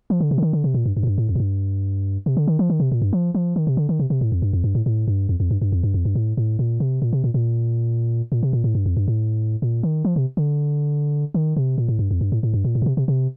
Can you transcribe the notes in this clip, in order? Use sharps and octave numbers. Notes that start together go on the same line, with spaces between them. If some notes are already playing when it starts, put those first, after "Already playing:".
F3
D3
C3
D3
D#3
D3
C3
A#2
G2
G2
A2
G2
A2
F2
A2
G2
C3
D3
D#3
F3
D#3
C3
A#2
G2
F3
F3
D#3
C3
D3
D#3
C3
C3
A2
F2
G2
F2
G2
A2
A2
G2
F2
F2
G2
G2
F2
G2
F2
G2
A2
A2
A#2
C3
A#2
C3
A#2
A#2
A#2
C3
A#2
A2
G2
F2
G2
A2
A#2
D#3
F3
C3
D3
D#3
C3
A#2
A2
G2
F2
G2
A2
A2
G2
A#2
A2
A#2
C3
C3
C3